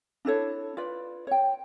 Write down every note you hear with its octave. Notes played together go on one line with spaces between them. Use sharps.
D4 E4 A4 C#5
F4 B4 D5
C#5 G5